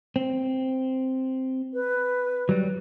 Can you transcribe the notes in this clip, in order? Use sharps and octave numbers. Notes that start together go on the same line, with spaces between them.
C4
B4
F#3 G3